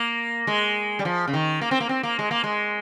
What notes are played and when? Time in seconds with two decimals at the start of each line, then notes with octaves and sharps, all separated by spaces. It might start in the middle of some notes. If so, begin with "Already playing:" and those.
Already playing: A#3
0.47 G#3
0.99 G3
1.05 F3
1.28 C#3
1.34 D#3
1.62 A#3
1.71 C4
1.80 A#3
1.89 C4
2.03 A#3
2.19 G#3
2.31 A#3
2.44 G#3